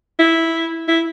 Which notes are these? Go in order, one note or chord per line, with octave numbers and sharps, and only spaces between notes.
E4
E4